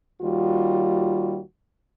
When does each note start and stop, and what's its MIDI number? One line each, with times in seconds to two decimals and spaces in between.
0.22 1.40 39
0.22 1.40 55
0.22 1.40 65
0.22 1.40 66